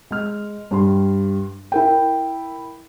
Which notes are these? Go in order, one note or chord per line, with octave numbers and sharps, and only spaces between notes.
G#3 F6
G2 G4 C6
E4 A#4 G5